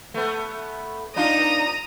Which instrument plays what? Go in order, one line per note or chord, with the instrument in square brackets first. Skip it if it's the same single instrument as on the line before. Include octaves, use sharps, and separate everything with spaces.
[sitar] A3 B3
[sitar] D4 D#4 F4 [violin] A#5 D#6